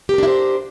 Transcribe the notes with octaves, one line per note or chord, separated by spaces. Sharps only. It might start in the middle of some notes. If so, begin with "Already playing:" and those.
D4 E4 G4 A#4 C5